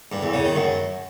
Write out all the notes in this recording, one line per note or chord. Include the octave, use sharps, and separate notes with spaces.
G2
E2
C#3
D#3
F#2